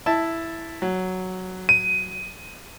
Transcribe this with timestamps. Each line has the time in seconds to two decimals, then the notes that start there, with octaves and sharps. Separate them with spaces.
0.06 E4 A5
0.82 F#3
1.69 D#7